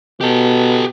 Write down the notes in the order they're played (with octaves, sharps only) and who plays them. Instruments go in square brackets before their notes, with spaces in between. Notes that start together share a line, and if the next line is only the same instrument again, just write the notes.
[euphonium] B2 [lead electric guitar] G4 A4